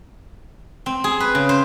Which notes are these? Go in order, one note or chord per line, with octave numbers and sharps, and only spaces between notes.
C4
G#4
B4
C#3
C5